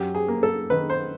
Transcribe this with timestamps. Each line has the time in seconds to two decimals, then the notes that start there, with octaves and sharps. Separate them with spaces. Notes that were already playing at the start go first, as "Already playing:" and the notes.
Already playing: F#2 G4
0.15 G#4
0.28 A#3
0.43 A4
0.70 D#3 B4
0.90 C5